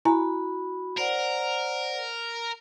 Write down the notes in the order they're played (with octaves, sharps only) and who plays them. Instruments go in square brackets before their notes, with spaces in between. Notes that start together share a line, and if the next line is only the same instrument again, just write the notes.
[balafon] E4 G#5 A#5 [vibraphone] F#4 B5
[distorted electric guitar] A#4 [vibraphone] C5 D5 F#5